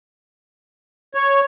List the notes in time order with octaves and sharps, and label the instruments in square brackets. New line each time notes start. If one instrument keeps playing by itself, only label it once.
[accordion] C#5